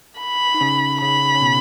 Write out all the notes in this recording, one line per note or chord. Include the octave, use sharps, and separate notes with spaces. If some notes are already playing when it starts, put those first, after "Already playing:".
B5
D#4
C#3 C#4
C#3 C#4 B5
C#4
B2 B3